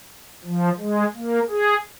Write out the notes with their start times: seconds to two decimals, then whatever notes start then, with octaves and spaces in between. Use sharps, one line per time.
0.44 F3
0.79 G#3
1.15 A#3
1.49 G#4